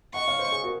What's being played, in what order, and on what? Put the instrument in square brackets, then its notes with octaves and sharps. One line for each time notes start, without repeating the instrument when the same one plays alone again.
[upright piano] D#5 F#5 [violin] C#6
[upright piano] C#5 F5
C5 D#5
G#4 C5
F#4 A#4